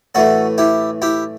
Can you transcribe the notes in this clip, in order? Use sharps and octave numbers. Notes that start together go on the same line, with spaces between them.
A2 E3 A3 F#4 A4
E4 G4
E4 G4